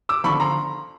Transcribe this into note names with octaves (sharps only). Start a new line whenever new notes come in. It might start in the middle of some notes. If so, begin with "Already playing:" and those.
D6 E6
D3 F3 B5 C#6
A#5 C6